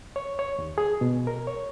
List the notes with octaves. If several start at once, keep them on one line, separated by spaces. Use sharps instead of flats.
C#5
C#5
D#2
G#4
B2
A#4
C#5